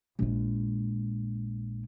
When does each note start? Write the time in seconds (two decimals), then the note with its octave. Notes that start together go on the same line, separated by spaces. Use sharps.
0.19 A#1 G#3